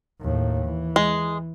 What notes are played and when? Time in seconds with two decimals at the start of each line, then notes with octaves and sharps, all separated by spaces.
0.21 D#2 A2
0.65 E3
0.96 G#3